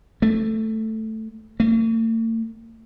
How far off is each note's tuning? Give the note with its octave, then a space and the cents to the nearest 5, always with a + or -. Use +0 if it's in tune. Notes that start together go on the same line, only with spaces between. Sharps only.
A3 +5
A3 +45